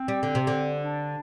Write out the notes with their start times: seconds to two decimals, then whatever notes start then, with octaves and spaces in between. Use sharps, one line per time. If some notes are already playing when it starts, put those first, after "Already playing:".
Already playing: C4
0.08 G3
0.23 D3
0.35 C3
0.47 D3
0.83 D4